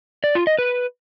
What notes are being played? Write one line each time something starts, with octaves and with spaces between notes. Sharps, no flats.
D5
F4
D#5
B4